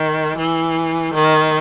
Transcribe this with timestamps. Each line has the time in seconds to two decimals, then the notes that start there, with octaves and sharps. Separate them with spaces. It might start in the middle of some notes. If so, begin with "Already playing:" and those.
Already playing: D#3
0.38 E3
1.14 D#3